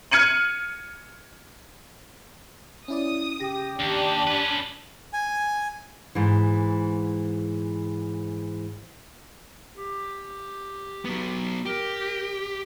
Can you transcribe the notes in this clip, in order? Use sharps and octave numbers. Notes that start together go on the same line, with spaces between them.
F6 G#6 C#7 D#7 F#7
C#4 E4 D5 D#6
C#3 G4 A#6
D#2 D4
C#4 B4 A5 B6
G#5
G#2 E3
G4
F#3 B3
G4 A#4